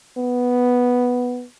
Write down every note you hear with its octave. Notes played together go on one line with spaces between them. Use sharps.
B3